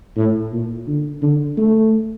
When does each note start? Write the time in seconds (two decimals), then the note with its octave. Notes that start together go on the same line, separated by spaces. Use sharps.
0.17 A2
0.52 A#2
0.87 D3
1.22 D3
1.57 A3